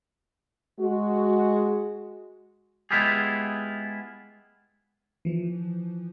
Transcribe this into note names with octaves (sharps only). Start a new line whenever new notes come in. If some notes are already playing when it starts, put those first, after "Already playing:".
G#3 F#4
G#3 B3 E4 F4 G4 G#4
E3 F3